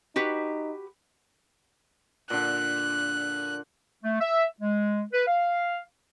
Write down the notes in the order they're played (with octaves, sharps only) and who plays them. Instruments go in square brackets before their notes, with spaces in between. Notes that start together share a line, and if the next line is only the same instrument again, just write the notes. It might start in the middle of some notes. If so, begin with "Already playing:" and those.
[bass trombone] D#4 [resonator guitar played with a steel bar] F#4 G4 B4
[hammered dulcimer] A#2 D3 [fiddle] F#6
[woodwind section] A3
E5
G#3
B4
F5